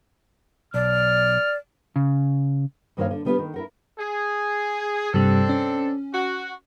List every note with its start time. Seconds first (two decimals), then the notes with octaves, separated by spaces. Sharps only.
0.74 B1 D5 F6
1.96 C#3
2.97 G2 D#3 A#3 C5 C#5 F5
3.11 D3
3.25 D3 G3 B3 D#4 F4 G4
3.39 D#3
3.54 E4 A#4 F#5
3.99 G#4
5.14 G2 C3 G3 C4 D4 A4
5.49 C#4
6.14 F#4